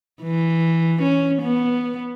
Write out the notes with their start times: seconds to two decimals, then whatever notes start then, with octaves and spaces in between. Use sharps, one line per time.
0.22 E3
1.02 C#4
1.42 B3